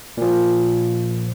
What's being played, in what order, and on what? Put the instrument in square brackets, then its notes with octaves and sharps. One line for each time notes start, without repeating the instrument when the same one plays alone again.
[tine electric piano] A#2 F3